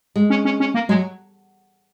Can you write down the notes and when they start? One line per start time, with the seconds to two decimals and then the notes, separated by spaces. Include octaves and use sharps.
0.16 G#3
0.30 C#4
0.45 C#4
0.60 C#4
0.74 A#3
0.89 F#3 G#3